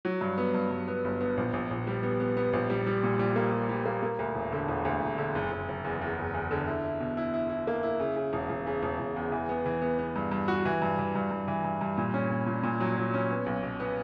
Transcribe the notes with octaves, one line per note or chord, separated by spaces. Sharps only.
F#3
G2
B3
G2
G2
B3
G1
B3
A#1
A#1
A#1
G3
B3
B3
B3
A#1
G3
G3
A#2
G3
A#3
G3
G3
A#3
A#3
D2
E1
D3
E1
D2
E1
D3
F#1
F#1
F#1
E2
E2
F#1
E2
D3
E4
E4
B2
E4
E4
E4
A#3
E4
C#3
C#3
E1
E1
C#3
E1
E1
E2
E3
B3
E3
B3
B3
G2
G2
F#4
E3
G2
E3
G2
G2
E3
G2
G2
A#2
C#4
A#2
A#2
A#2
F#3
F#3
C#4
B3
B1
B2
B3